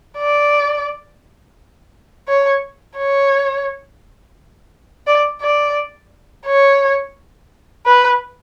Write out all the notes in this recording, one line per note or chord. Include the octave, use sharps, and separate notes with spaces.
D5
C#5
C#5
D5
D5
C#5
B4